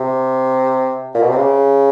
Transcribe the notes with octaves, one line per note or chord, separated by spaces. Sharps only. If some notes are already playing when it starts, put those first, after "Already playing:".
Already playing: C3
A#2
B2
C3
C#3